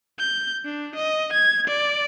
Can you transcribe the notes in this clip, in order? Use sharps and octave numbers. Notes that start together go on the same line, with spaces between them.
G6
D4
D#5
G#6
D5